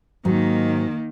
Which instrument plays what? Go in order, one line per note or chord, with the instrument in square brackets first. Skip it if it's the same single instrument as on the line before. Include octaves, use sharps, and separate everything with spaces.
[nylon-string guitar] G#2 F#3 [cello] D#3 A#3